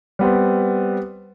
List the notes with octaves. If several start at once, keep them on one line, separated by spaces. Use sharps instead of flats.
G3 B3 C4